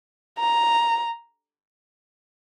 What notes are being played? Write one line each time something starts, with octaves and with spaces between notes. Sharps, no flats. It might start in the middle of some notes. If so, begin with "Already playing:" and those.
A#5